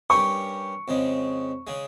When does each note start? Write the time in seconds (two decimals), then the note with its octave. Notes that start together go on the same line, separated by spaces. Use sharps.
0.10 G2 G3 C#4 G4 A#4 C#6
0.88 F2 C#3 G#3
1.67 C#3 G#3